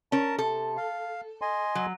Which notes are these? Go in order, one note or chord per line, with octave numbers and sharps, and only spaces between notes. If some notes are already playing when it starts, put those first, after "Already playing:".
C#4 A#4 A5
C3 A4
F5
D#5 G#5 C6
F#3